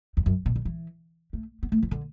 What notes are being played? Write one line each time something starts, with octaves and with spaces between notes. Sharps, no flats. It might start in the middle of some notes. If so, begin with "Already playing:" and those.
E2
F#2
B2
D3
E3
A3
B3
A3
E3
D3